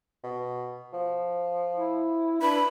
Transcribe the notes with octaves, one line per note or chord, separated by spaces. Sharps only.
B2
F3
E4
D4 B4 B5